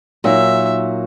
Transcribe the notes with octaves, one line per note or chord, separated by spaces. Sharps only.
A#2 F#3 A#3 D#4 E5